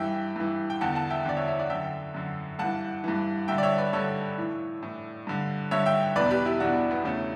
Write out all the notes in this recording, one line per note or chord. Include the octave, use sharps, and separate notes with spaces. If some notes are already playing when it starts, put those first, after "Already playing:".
Already playing: G2 E3 E5 G5
G2 E3
G5
E2 D3 F#5 A5
F#5 A5
E5 G5
E2 D3 D5
C#5 E5
C#5 E5
D5 F#5
F#2 D3 E5 G5
F#2 D3
G2 E3 F#5 A5
G2 E3
G2 D3 E5 G5
D5
C#5 E5
B4 D5
G2 D3 A4 C#5
A2 E3
A2 E3
G2 D3
G2 D3 C#5 E5
E5 G5
E2 B2 B4 D5
G4 B4
E4 G4
E2 B2 D4 F#4
B3 D4
E2 C#3 E3 A3 C#4